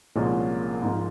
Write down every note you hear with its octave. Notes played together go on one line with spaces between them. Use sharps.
C2 A#2 F3 G#3 C#4
G#2 F3 G#3